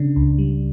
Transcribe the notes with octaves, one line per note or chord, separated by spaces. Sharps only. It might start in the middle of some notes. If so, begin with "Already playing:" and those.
Already playing: C#3 D4
C#2
G3